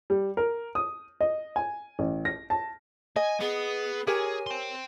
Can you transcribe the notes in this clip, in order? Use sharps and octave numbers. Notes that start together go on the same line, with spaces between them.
G3
A#4
D#6
D#5
G#5
A1
A#6
A5
D#5 G#5
B3 G#4
G4 G#4 A#4 C#5 G#5
G5 C6